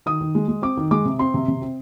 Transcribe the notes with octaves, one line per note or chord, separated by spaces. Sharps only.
D#3 D#6
D#3
G#3
G#3
C4 D6
D#3
G#3 D6
C3
C4 C6
C3
C3
C4